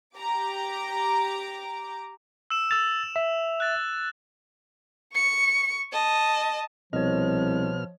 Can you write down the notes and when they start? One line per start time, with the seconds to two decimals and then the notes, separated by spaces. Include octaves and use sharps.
0.16 G4 A#5 D6
2.50 E6 E7
2.71 E6 A6 F7
3.16 E5
3.60 F#6 A6
5.14 C#6 C#7
5.92 D#5 A5
6.93 C2 B2 F3 C#5 D#5 F6